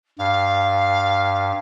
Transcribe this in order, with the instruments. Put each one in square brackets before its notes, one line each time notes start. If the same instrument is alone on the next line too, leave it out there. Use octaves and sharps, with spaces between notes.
[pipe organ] G2 [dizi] F5